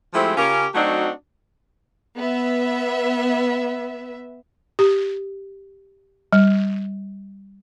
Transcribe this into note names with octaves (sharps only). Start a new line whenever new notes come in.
F3 G#3 A3 C4 E4 G4
C#3 C#4 F4 G4 A#4
F#3 A3 C4 D4 D#4 F#4
B3 E5
G4
G3